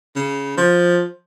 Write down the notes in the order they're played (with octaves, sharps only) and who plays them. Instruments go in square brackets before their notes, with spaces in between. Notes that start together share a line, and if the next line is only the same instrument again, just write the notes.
[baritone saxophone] C#3
F3